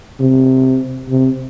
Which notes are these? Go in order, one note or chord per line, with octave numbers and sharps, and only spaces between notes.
C3
C3